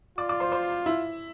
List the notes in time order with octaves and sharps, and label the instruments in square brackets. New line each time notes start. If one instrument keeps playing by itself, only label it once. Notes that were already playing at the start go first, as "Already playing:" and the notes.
[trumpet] F4 [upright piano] D5 D6
[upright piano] D5 D6
C5 C6
C5 C6
E4 E5